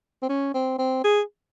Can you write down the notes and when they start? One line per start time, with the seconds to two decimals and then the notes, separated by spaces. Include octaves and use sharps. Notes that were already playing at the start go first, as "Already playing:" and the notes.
0.22 C4
0.29 C#4
0.54 C4
0.78 C4
1.04 G#4